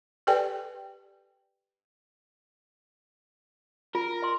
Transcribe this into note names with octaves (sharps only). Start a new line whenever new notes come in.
G4 A4 B4 D5 G5 G#5
F4 A#4
D#5 C6